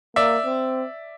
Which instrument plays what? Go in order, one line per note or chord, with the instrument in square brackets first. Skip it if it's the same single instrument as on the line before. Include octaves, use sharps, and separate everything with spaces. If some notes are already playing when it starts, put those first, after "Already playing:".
[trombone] A#3 [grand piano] D5 E5
[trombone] C4